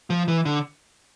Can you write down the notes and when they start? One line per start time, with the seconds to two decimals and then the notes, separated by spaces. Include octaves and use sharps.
0.10 F3
0.28 E3
0.45 D3